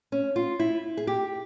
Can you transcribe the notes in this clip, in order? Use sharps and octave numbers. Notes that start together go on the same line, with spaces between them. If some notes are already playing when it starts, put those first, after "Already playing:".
C#4
F4
E4
G#4
G4